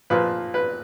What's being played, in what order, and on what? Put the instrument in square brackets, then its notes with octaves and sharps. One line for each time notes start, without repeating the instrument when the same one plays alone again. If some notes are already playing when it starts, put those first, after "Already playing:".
[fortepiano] A#2 F3 B4
B4